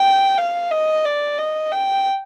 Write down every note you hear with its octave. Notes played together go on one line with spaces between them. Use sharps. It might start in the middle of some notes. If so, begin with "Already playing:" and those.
Already playing: G5
F5
D#5
D5
D#5
G5